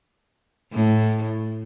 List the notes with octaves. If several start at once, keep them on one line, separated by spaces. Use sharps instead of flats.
A2